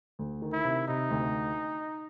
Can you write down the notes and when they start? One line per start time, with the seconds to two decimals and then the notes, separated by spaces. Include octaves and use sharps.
0.19 D2
0.42 D#3
0.53 E4
0.64 C3
0.88 C3 D#4
1.11 D2